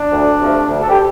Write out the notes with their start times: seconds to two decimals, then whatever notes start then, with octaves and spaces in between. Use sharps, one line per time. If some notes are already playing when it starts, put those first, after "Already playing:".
Already playing: D4
0.11 D2
0.40 C3 F3 A3
0.69 D2
0.82 A4
0.89 G4